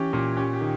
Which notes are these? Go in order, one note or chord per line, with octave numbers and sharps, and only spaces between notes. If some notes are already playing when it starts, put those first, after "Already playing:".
Already playing: E3 C#4 G4
A#2
C#4 G4
G4
D#3